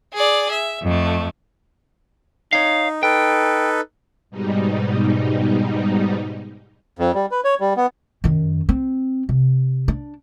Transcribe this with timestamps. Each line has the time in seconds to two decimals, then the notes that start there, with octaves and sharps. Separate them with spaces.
0.14 G#4 D5
0.49 E5
0.84 F2 A3
2.53 D#4 C#5 F5
3.03 D#4 A4 B4 G5
4.30 G#2 B2 G3 D#4
6.99 F2
7.15 G3
7.31 B4
7.44 C#5
7.60 G3
7.77 B3
8.24 F#2 D#3
8.69 C4
9.29 C3
9.88 D4